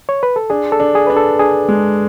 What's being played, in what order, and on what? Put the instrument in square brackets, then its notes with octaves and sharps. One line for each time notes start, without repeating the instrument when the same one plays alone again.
[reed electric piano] C#5
B4
A4
[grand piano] D4 [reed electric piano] G#4
[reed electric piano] A4
[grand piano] D4
[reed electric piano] G#4
[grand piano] D4 [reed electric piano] B4
[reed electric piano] A4
[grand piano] D4 [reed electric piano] G#4
[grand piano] G#3